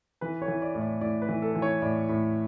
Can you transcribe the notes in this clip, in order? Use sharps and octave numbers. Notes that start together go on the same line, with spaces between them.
E3 B4
C#5
E3
D5
A2
D5
A2 D5
B4
E3
A4
E3
C#5
A2 D5
A2